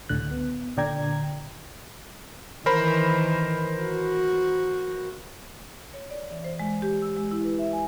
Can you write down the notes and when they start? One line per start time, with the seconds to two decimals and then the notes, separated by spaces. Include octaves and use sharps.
0.09 C#2 A2 D3 F#6
0.31 B3
0.77 A#2 D3 D5 G5 A#5 G#6
2.66 D#3 E3 A#4 C5 B5
3.83 F#4
5.94 C#5
6.11 D5
6.31 E3
6.44 C5
6.59 G#3
6.82 G4
7.02 E6
7.17 G#3
7.31 E4
7.44 B4
7.59 E5
7.73 G#5